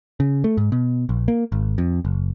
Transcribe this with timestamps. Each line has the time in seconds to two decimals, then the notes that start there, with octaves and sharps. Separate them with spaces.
0.20 C#3
0.44 A3
0.57 G#2
0.72 B2
1.09 A#1
1.28 A#3
1.52 G#1
1.78 F2
2.05 F#1